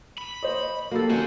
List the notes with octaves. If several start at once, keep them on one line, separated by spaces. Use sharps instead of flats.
B5
C5 C#5 D#5
F#3 A#3 G4 A4
A3 C#4 C5 F#5 G#5